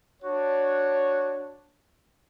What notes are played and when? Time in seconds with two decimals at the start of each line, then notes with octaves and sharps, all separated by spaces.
0.23 D4 F#4 C#5